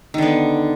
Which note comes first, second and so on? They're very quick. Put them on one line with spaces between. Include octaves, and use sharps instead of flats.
D#3 D3 B3